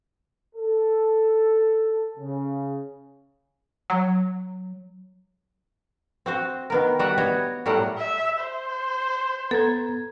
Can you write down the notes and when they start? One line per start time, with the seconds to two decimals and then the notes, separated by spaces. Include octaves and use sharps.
0.56 A4
2.18 C#3
3.90 F#3
6.26 C4 F#4 C5
6.70 D#3 B3 A#4
6.99 G3 F#4 E5 F#5
7.18 B3 F#4 C#5 D#5
7.66 A2 F#3 G3 A3 A#4 F#5
7.98 E5
8.40 C5
9.51 B3 A4 A#5 G#6